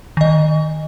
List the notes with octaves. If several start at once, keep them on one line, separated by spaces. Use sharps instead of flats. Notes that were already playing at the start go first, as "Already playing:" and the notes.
D#3 D#5